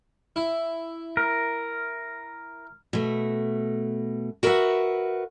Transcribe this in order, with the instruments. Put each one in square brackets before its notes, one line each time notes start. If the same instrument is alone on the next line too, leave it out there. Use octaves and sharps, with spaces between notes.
[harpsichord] E4
[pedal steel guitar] A#4
[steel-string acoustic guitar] B2 A3
F#4 A#4 B4 D5 E5 F#5